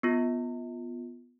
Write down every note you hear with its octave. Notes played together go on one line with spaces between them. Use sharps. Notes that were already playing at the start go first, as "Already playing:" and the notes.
B3 F4